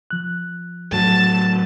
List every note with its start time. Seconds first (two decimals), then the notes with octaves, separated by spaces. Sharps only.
0.11 F3 F#6
0.92 A2 F#3 A5